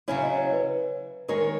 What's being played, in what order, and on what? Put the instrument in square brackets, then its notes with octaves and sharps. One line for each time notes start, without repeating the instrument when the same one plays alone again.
[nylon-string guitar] C#3 F#3 C#4 E4 [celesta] C#5
[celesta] D#5
C#5
B4
[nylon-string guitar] D#3 G#3 D#4 A#4 C#5